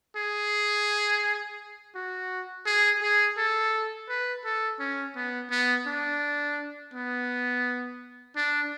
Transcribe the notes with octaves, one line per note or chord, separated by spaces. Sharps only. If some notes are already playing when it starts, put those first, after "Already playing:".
G#4
F#4
G#4
G#4
A4
B4
A4
C#4
B3
B3
D4
B3
D4